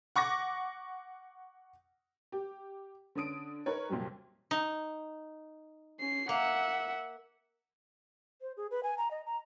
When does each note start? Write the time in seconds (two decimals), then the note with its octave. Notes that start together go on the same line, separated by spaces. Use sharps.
0.16 F#5 C#6 D6 A#6
2.32 G4
3.15 D3 C#4 D#6 D7
3.66 D#4 A#4 B4 C#5
3.89 C2 F2 A#2 F#3 G3
4.51 D#4
6.00 C#4 C7
6.29 A#3 E5 F#5
8.42 C5
8.57 G#4
8.71 B4
8.83 G#5
8.98 A#5
9.11 D#5
9.26 A#5